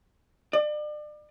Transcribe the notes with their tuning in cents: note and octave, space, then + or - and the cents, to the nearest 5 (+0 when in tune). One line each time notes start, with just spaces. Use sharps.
D5 +35